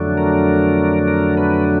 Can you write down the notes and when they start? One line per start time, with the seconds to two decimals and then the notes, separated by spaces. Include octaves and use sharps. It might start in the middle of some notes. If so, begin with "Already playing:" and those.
Already playing: F2 D3 F#3 A3 D4
0.18 A#4
1.08 A#4
1.37 B4